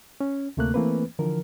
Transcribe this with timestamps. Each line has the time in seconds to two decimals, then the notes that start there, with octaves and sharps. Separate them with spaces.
0.21 C#4
0.57 D2 C3 A3 A#3 F#6
0.74 E3 A3 A#3 C4 B4
1.19 D3 E3 F3 A#4